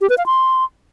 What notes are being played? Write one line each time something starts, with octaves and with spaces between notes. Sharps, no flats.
G4
B4
F5
C6